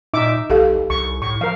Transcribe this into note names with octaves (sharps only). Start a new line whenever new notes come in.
A#2 D#4 E5 D6
B1 G4 A4 F5
C2 C#6
A2 C#6
F3 A#4 F5